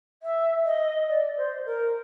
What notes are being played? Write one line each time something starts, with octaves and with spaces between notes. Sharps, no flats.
E5
D#5
D5
C5
A#4